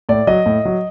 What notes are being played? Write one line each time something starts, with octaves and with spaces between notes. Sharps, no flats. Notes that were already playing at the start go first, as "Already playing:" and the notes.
A2 D5
F#3 D#5
A2
F#3